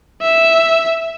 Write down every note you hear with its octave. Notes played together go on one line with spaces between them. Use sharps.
E5